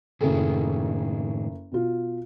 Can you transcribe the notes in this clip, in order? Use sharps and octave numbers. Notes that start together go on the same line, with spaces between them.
F#1 A2 D#3 G#4 A4
B2 F4